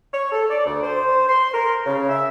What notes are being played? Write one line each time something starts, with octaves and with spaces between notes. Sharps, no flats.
C#5
A4
D5
D2
C5
C6
A#4
C#3
E5